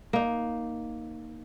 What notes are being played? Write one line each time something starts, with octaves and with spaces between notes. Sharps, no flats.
A#3 D#4